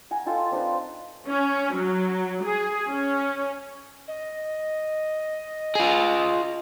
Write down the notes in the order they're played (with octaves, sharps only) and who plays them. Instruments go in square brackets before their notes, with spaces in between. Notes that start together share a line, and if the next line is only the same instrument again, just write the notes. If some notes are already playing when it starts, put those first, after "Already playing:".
[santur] F#5 G#5 A#5
D#4 F4 A4 G5
C4 D4 D#4 B4
[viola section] C#4
F#3
G#4
C#4
[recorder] D#5
[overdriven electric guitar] F4 G#4